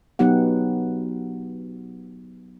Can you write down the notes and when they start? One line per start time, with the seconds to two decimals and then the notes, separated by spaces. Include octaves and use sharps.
0.19 F#3 B3 D#4 G4 F#5